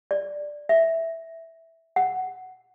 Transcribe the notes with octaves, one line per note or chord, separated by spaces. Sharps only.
D5
E5
F#5